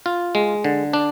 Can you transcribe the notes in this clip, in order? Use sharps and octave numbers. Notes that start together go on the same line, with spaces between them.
F4
G#3
D3
D4